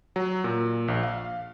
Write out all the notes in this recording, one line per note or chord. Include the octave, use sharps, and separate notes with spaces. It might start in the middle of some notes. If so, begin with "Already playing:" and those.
F#3
A#2
A#1
F5